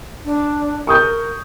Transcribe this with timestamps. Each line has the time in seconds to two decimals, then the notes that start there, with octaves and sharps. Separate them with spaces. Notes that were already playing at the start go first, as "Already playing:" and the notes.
0.25 D4
0.87 A#4 C#6 D#6 G6